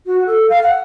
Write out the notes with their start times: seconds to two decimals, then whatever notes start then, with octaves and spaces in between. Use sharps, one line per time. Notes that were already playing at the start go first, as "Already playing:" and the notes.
0.06 F#4
0.26 A4
0.49 F5
0.63 F#5